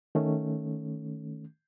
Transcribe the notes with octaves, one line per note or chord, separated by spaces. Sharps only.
D#3 A3 C#4